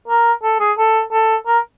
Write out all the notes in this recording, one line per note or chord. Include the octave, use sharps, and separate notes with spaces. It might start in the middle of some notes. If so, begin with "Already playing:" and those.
A#4
A4
G#4
A4
A4
A#4